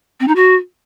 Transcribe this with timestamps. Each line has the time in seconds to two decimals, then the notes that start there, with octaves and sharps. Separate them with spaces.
0.20 C4
0.28 D#4
0.36 F#4